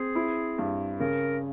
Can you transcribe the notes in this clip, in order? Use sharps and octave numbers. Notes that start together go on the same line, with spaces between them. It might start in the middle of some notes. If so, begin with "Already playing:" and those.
Already playing: C4 G#4
E4
G2
C#3 A#4